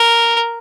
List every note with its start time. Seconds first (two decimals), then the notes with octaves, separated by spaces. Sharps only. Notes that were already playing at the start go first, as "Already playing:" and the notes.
Already playing: A#4